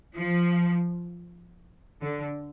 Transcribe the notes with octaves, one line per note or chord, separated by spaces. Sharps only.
F3
D3